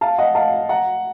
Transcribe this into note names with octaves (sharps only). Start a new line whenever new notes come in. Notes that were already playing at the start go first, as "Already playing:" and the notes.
F5 A5
D#5 F#5
F5 A5
F#5 A#5